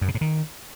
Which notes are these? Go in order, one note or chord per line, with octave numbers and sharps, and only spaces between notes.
F#2
C3
A2
D#3